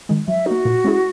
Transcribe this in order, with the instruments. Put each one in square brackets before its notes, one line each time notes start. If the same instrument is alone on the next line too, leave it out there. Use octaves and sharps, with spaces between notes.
[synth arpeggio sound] D#3 G#3
[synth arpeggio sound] F#3 [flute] E5
[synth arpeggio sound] A#3 D#4 [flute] F#4
[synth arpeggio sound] A#2
G#3 C#4 E4 G#4